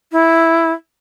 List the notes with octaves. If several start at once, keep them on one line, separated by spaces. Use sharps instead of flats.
E4